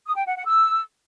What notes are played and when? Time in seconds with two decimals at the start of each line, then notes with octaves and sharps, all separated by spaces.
0.06 D#6
0.16 G5
0.26 F#5
0.37 F#5
0.47 E6